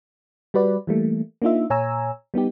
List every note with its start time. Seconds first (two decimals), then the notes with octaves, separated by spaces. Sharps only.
0.54 G3 F#4 B4 D5
0.87 E3 G3 A3 A#3
1.42 A#3 D4 D#4 F4 E5
1.70 A#2 C#5 G#5 A#5 E6
2.34 G3 B3 D#4 G4